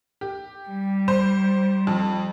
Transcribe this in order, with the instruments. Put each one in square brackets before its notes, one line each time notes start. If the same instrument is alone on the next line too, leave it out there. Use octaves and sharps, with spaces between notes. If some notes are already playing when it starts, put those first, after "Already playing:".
[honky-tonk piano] G4
[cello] G3
[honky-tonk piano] C5
F2